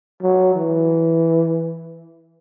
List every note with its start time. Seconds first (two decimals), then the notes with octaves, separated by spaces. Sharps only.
0.22 F#3
0.55 E3